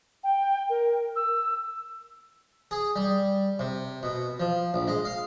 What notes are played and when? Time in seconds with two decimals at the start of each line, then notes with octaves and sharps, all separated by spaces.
0.24 G5
0.70 A#4
1.16 E6
2.71 G#4
2.96 G3
3.59 C3
4.03 B2
4.40 F3
4.74 A#1
4.88 G#3
5.05 F5